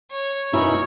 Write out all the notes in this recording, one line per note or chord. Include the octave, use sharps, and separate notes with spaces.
C#5
F#2 B2 C#4 D#4 E4